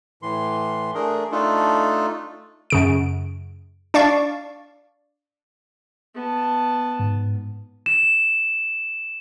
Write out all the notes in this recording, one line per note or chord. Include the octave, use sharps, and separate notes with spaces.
A2 E3 C6
A3 D4 G#4 A#4
A3 D4 D#4 F4 A4
F#2 C#3 D7
D4 D5 F5 C#6
B3 A5
G#2
E7